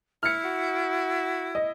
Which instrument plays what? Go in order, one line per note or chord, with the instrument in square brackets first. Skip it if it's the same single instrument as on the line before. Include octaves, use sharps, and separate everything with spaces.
[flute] E4 [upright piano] F6 C#7
[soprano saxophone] F#4
[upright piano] D#5